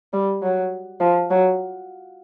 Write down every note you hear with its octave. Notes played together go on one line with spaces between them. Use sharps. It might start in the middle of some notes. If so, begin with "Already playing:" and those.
G3
F#3
F3
F#3